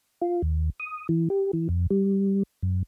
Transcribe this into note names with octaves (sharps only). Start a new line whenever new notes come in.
F4
D#2
D#6
E3
G4
E3
F2
G3
F#2